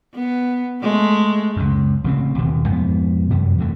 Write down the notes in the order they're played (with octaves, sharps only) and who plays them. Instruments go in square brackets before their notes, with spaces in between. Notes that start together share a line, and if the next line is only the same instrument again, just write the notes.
[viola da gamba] B3
G#3 A3
[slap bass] C#2 F#2
A1 C#3 E3 C4
D#1 D#2 B2
F2 G#2 G#3 B3
F#2 C3 E3 G3
E2 D3 A3